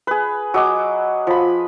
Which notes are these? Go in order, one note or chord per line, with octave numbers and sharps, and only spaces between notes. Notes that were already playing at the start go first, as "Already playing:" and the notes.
G#4 B4
F#3 D#5 D6
F3 B5